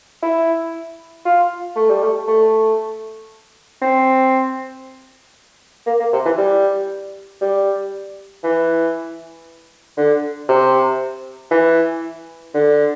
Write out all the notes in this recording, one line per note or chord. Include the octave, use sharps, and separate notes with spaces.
E4
F4
A3
G3
A3
A3
C4
A#3
A#3
C3
E3
G3
G3
E3
D3
C3
E3
D3